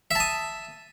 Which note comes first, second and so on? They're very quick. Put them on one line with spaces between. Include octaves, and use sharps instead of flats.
E5 A5 D#6